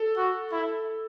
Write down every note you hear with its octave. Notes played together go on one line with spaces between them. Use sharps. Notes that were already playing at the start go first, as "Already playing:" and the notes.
Already playing: A4
F#4
E4